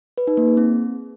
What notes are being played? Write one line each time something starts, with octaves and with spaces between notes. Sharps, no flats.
B4
D#4
A#3
G#4
C4